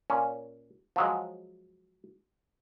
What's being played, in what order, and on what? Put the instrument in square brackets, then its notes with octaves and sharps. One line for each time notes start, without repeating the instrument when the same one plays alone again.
[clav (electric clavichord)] A#2 C#4
F3 F#3 G#3